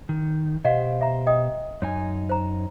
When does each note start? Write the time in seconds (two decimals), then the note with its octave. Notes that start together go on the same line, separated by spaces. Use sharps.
0.09 D#3
0.65 B2 G4 C5 D#5 F5 F#5
1.01 E5 A#5
1.27 D#5 G5 D#6
1.82 F#2 D#4 C#5 G#5
2.29 C5 A#5